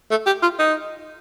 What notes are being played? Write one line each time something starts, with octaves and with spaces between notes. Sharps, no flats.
A3
G4
F4
D#4